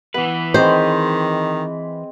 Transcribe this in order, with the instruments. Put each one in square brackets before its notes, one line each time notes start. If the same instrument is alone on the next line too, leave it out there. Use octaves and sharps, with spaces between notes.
[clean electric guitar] E3 B4 [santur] B3
[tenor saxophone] D#3 [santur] G#3 C4 B5 [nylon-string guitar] C5